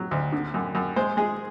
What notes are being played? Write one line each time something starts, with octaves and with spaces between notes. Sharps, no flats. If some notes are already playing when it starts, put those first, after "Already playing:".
Already playing: F#3
D2
D3
F#2
F#2
G#3 C5
G#3 G#4